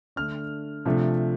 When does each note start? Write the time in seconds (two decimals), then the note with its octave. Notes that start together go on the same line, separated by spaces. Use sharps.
0.16 D3 A3 D4 F6
0.85 C3 F3 A3 D4